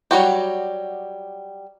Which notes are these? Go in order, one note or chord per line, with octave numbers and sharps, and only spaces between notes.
F#3 G3 F#4 G4